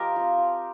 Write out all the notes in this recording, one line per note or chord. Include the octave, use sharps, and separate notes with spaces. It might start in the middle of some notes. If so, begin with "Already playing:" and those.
Already playing: F3 G4 A#4 C5 D#5
C4 F4
F3